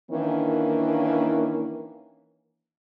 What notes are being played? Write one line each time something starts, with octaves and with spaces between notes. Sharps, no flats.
D#3 E3 A#3 C#4 D4 A#4